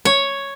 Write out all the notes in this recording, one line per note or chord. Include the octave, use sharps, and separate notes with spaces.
C#5